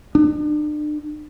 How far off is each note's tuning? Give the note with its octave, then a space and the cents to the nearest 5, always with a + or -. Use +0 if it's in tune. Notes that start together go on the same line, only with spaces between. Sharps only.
D4 +40